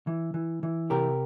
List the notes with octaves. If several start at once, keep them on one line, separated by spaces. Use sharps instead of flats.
E3
E3
E3
C3 G4 A#4